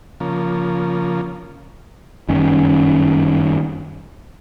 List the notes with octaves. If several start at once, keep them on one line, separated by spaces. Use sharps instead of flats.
C#3 F3 A#3
F#1 G2 D#3 C#4